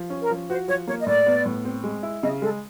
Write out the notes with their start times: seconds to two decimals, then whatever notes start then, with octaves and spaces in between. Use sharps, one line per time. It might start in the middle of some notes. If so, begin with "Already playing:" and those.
Already playing: F3
0.10 C#4
0.21 A#4
0.30 F3
0.50 F#4 C5
0.68 F3 C#5
0.87 A#3 C#5
1.01 D#5
1.06 A2 D5
1.26 B3
1.46 A2
1.65 C4
1.84 G#3
2.03 E4
2.23 C#3 D#5
2.41 G#3 A4